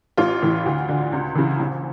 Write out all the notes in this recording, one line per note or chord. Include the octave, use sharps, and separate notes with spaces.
A1 F4
A2 E3
D2
D3
C#2
C#3 E3
A#1